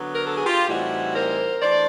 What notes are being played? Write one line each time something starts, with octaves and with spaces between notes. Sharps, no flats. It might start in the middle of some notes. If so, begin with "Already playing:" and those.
Already playing: D3 F#3 B3
A#4
A4
G#4
F4 G4
A2 E3 G3 C4 D#4 E4 F#4
A#4 C5
E3 A3 D4 C5 D5